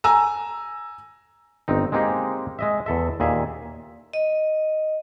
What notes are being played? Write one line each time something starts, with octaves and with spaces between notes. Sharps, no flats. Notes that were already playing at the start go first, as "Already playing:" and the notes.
G#5 A#5 E6
G1 C4 D#4
G#3 A#3 C4 D#4 G4 G#4
G#3 D#5 E5
E2 A4 E5
D#2 A#2 G#4 E5
D#5